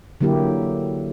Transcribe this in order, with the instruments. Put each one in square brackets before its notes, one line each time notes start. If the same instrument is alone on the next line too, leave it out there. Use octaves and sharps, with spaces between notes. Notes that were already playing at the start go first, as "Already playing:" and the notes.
[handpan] D3 F#3 A#3 E4 G4